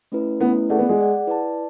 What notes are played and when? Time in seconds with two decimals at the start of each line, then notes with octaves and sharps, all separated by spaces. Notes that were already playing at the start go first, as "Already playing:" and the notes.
0.12 A3 C#4 E4 B4
0.41 A3 B3 C#4 E4 B4
0.69 A3 G#4 D5 F#5
0.79 B3
0.89 G#3
0.98 G#4 D5 F#5
1.27 E4 B4 D5 A5